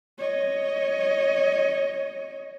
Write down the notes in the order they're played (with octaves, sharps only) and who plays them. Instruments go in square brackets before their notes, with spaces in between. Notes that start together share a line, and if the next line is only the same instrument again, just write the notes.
[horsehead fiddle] C#5 D#5